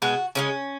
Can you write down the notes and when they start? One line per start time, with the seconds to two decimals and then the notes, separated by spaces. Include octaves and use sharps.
0.02 B2 G#3 F#4
0.35 C#3 E3 G#3 C#4